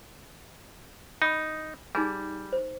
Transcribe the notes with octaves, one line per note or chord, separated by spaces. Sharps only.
D#4 B5 D#6
G3 D#4 G#4 G#5
C5